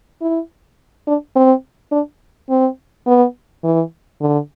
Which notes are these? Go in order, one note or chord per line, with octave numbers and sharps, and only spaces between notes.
E4
D4
C4
D4
C4
B3
E3
D3